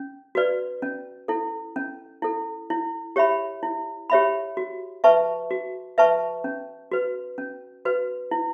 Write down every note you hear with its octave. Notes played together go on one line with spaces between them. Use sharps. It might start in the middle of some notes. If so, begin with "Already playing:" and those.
Already playing: C#4
F#4 B4 D5
C#4
E4 A4
C#4
E4 A4
E4
G4 C#5 E5 B5
E4
G4 C#5 E5 B5
F#4
B4 E5 A5 C#6
F#4
B4 E5 A5 C#6
C#4
F#4 B4
C#4
F#4 B4
E4